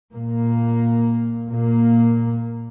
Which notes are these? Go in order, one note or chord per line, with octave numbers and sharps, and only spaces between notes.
A#2 A#3
A#2 A#3